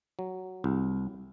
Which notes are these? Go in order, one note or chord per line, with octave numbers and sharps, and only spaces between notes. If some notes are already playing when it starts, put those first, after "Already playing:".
F#3
C2